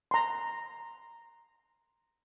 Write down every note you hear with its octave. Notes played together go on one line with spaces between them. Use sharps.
A#5 C6